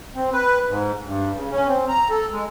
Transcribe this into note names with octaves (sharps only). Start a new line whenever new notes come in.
C4
B4
G#2
G2
C#3
C#4
C4
A#5
A4
G#3